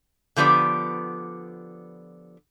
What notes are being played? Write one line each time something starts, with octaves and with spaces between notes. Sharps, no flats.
D3 F3 B3 G4 D5